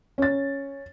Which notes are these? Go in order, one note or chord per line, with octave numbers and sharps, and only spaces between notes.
C#4 A6